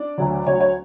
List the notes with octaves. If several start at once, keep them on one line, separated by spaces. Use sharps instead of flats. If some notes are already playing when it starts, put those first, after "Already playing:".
Already playing: D4 D5
D2 D3 F#3
D2 D3 F#3 C#5
C#5